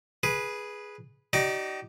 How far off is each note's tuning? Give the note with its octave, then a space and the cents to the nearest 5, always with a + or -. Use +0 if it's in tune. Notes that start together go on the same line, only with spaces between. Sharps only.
G#4 +0 B4 -10
D#4 +0 G4 -45 D5 +0